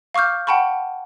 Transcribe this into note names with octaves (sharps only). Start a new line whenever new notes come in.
F5 C#6 D6 F6 G6
F#5 G5 A5 B5 C#6